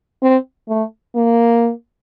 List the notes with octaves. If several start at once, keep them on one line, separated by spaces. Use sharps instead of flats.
C4
A3
A#3